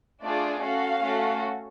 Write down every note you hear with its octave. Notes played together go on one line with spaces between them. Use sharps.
A3 D4 F4 G#4 D5
C#4 F#4 A4 F5
A3 C#4 F#4 A4